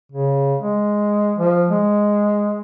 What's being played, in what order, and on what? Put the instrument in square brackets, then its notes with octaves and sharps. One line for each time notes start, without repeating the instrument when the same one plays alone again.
[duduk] C#3
G#3
F3
G#3